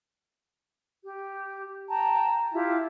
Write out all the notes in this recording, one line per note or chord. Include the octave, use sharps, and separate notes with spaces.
G4
G5 A5 A#5
E4 F4 G4